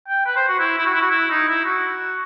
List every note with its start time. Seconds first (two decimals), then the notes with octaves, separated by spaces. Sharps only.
0.08 G5
0.26 B4
0.36 C5
0.48 F#4
0.60 E4
0.77 E4
0.86 F#4
0.94 E4
1.02 F#4
1.10 E4
1.31 D#4
1.48 E4
1.65 F#4